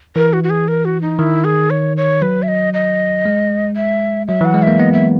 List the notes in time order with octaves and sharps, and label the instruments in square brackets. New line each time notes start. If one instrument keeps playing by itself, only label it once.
[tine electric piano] E3 [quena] A#4
[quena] F#4
F#4
G#4
A#4
F#4
D#4
[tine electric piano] D#3 [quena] E4
[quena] G#4
C#5
C#5
[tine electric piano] F#3 [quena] B4
[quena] E5
D#5
D#5
[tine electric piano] G#3
[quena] E5
[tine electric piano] F#3 [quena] E5
[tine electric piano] E3 [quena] F#5
[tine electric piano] G#3
[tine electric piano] A#3 [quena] E5
[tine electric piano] B3 [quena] D#5
[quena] E5